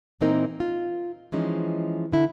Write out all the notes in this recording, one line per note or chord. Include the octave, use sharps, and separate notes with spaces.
A#2 E3 A#3 C4 D#4 A#4
F4
E3 F3 G#3 C#4 D#4
D3 E4